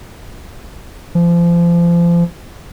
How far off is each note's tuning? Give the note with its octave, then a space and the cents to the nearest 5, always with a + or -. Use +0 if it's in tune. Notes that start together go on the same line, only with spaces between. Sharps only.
F3 -30